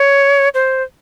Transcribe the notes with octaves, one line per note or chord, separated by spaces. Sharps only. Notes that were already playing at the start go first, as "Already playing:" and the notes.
Already playing: C#5
C5